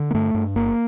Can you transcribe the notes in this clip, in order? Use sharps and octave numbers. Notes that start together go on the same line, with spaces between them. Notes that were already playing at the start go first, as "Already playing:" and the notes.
Already playing: D3
A#3
G2 A3
G2
G1 A#3